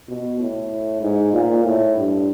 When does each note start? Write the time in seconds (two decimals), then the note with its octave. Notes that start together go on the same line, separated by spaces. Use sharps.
0.08 B2
0.40 A2
1.02 G#2
1.33 A#2
1.65 A2
1.96 G2